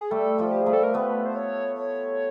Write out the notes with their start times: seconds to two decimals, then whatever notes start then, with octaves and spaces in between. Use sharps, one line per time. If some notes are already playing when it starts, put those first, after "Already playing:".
0.01 G#4
0.11 G3 A3 A4
0.38 F3 G3
0.52 G4
0.62 G3 A3 G#4
0.73 A4
0.83 A#4
0.94 A3 B3 B4
1.26 C5
1.36 C#5